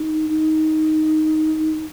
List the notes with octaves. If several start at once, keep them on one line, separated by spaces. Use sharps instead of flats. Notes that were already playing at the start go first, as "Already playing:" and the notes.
Already playing: D#4
D#4